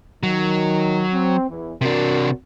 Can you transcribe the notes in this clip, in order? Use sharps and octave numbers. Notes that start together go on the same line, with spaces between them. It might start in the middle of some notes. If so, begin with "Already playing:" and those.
D#3 F#3
C4
E2 E3
C3 D4 F#4 A#4